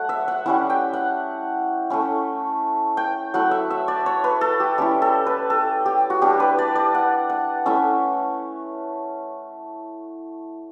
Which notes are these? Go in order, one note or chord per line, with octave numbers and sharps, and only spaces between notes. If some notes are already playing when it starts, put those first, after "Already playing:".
Already playing: F#3 A3 F#5
E5
F#5
G3 C#4 E4 F#5
G5
F#5
A3 C#4 E4
G5
F#3 A3 E4 F#5
E5
E5
D5
C#5
B4
A4
G4
G3 C#4 E4 G4
A4
B4
A4
G4
F#4
G3 D4 G4
B4
D5
D5
F#5
F#5
A3 C#4 E4 E5